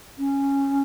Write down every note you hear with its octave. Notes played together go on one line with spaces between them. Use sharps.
C#4